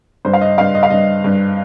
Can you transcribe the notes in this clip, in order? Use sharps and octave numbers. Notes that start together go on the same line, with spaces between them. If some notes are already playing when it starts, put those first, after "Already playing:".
G2 C5
F5
D#5
G2 F5
D#5
F5
G2 D#5
G2